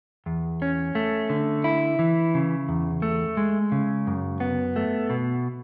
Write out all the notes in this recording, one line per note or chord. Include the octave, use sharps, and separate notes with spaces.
E2
C#4
A3
D3
E4
E3
C#3
E2
A3
G#3
C#3
F#2
B3
A3
B2